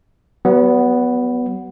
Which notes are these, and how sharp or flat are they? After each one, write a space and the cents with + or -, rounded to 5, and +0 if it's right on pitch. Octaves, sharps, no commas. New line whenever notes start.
F#3 +45 B3 +0